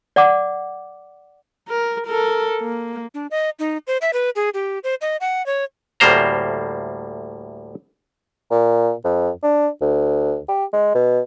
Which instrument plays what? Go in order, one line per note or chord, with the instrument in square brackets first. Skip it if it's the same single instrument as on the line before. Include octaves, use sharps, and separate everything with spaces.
[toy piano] D5 F#5 D6
[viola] A#4
A4 A#4
A#3
[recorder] D4
D#5
D#4
C5
E5
B4
G#4
G4
C5
D#5
F#5
C#5
[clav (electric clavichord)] D2 A2 G3 A#3 C5 A#5
[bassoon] A#2
F2
D4
D2
G4
G#3
B2